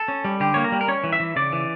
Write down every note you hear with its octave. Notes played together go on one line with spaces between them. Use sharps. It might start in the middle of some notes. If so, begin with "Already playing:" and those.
Already playing: A4
C#4
G3
D3 G4
A#3 C#5
A#4
G3
A#4
C#4 C#5
E3
E5
E3
C#3 D5
E3